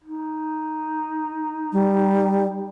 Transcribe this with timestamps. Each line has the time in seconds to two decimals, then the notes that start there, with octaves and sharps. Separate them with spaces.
0.05 D#4
1.73 G3